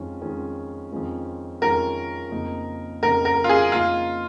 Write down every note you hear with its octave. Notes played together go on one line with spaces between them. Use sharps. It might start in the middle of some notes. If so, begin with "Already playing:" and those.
Already playing: F2 D#3 G#3 C#4 F4
F2 D#3 G#3 C#4 F4
F2 D#3 G#3 C#4 F4
F2 D#3 G#3 C#4 F4 A#4
F2 C#3 A#3 D#4
F2 C#3 A#3 D#4 A#4
A#4
F4
G#4
F2 C#3 A#3 D#4 F4